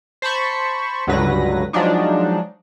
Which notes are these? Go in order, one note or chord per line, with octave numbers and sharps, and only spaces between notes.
C5 A5 B5 C#6
C#2 G2 D3 F#3 B4 A#6
F3 F#3 G#3 D4 D#4